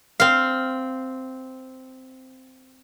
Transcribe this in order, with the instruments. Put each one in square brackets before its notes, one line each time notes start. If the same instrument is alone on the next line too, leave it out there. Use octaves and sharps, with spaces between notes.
[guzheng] C4 F5